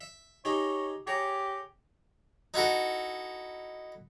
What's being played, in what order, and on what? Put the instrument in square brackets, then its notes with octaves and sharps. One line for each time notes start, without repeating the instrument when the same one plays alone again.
[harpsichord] E5
[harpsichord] D#4 G4 G#4 [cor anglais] C#5
[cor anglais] G4 [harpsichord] G#4 C#5 A#5
[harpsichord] D#4 E4 F#4 A4